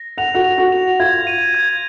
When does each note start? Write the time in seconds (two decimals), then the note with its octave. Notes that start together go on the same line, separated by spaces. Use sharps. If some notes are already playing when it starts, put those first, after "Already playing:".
Already playing: A#6
0.18 F#5 F7
0.35 F#4 F#5
0.44 F7
0.58 F#4 F#5
0.72 F7
1.00 F4 F5 G#6
1.27 D#7
1.55 G#6